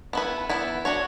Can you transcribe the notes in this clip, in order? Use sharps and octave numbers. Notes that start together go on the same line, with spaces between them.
B3 E4 B4
E3 B3 E4
D4 F#4 C#5